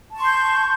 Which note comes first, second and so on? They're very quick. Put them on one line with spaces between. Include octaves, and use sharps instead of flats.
A5 C#6 C6 G6